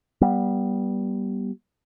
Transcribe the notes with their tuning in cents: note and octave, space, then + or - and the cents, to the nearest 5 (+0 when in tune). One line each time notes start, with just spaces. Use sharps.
G3 -10 B3 -30